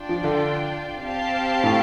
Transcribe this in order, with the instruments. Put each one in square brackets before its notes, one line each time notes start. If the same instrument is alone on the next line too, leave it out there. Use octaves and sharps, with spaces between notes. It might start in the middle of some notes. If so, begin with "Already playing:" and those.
Already playing: [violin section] D4 F4 D5 G5
[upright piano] F3
D3
[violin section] C4 G4 F5 A5
[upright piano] A2